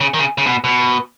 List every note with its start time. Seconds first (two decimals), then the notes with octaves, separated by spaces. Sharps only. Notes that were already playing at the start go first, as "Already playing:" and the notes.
0.01 C#3
0.14 D#3
0.19 C#3
0.38 C#3
0.46 B2
0.64 B2